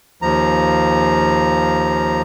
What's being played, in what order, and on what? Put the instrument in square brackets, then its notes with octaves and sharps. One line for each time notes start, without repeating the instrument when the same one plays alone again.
[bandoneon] D#2 F3 A#5